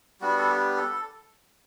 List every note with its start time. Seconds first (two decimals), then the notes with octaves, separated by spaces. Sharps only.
0.21 G3 B3 D4 F#4
0.38 A4
0.49 G4
0.77 A4